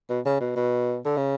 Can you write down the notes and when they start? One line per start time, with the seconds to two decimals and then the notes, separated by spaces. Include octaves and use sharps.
0.09 B2
0.25 C#3
0.40 B2
0.56 B2
1.05 D3
1.17 C#3